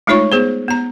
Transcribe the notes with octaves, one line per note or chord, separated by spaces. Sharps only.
G#3 A3 D#4 F4 C#5 C#6
B3 G#4 C5
B3 A#5